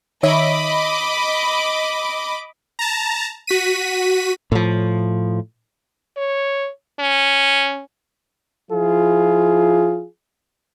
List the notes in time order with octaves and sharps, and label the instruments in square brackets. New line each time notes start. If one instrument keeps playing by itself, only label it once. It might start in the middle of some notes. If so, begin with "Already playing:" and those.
[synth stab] D#3 C#5 E5 [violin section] D#5 B5 D6
[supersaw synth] A5 A#5
F#4 B6 D#7
[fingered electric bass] A2 F3
[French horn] C#5
C#4
[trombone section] F3 E4 F4 G#4